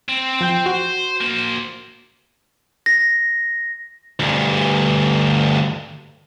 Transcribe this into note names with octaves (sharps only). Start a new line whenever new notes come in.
C4
F3 G5 G6
F#4 C5
A#3 C5
A#6
D2 G2